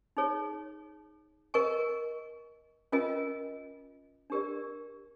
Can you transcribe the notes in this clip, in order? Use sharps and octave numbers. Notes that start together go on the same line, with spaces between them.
D#4 G#4 C#5
A#4 D#5 G#5 C#6
C#4 F4 A#4 D#5 G#5
D4 G4 A#4 D5